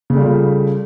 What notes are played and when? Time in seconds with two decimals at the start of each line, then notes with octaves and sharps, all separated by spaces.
0.10 C#3
0.13 A3
0.17 G3
0.20 F4